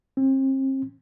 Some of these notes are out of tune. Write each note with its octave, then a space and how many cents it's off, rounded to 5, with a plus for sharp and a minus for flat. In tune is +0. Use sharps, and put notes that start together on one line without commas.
C4 +35